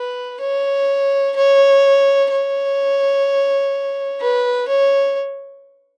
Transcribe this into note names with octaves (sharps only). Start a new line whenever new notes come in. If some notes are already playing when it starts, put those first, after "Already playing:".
Already playing: B4
C#5
C#5
C#5
B4
C#5